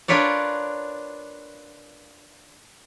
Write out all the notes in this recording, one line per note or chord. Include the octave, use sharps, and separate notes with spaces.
D4 F4 A#4 B4 C#5 D5